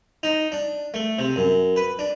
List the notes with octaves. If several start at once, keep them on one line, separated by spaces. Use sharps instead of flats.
D#4
D4
A3
C3
F#2
B4
D4